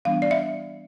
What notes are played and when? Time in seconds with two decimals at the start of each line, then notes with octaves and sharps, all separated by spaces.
0.05 E3 G3 B3 D4 F5
0.22 D5
0.31 E5